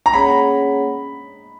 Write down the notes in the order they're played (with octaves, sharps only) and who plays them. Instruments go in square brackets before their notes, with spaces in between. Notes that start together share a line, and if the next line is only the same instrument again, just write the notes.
[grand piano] A#5
[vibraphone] A#3 C#4 G#4 C#5 F#5 [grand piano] B5